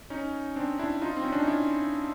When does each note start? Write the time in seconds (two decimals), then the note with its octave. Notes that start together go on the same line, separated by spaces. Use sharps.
0.10 C#4 D#4
0.56 C4 D4
0.79 D4 E4
1.02 D#4 F4
1.17 C4
1.24 C#4
1.32 D4
1.40 D#4
1.47 D4 E4